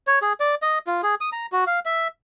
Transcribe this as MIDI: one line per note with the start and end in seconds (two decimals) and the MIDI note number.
0.07 0.19 73
0.22 0.33 68
0.40 0.55 74
0.62 0.79 75
0.87 1.01 65
1.03 1.15 68
1.21 1.30 87
1.32 1.46 82
1.52 1.64 66
1.67 1.80 77
1.85 2.08 76